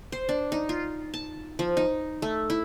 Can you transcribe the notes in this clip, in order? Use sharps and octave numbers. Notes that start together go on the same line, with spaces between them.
C5
D4
D#4
F4
A5
F3
D#4
A3
E4